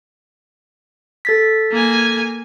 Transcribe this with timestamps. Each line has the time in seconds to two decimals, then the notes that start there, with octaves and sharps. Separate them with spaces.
1.25 A4 A6 B6
1.71 A#3 G#5